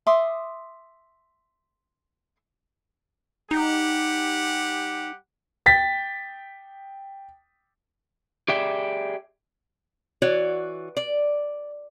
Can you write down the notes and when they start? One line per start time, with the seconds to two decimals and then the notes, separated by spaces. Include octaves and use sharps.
0.07 E5 C6 D6 D#6
3.51 G3 D#4 G4 F#5
5.66 G5 A6 B6
8.48 G4 G#4 D5 E5 G5
10.22 E3 F#4 C#5 D5
10.97 D5